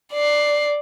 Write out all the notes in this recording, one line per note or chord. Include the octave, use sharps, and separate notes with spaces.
D5 C7